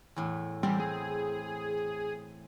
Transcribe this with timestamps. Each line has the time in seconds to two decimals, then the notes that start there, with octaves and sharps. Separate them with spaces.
0.16 E2 A2
0.63 E2 G3 C4
0.80 G#4